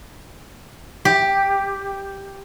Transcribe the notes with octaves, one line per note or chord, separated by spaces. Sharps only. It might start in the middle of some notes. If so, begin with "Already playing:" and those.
G4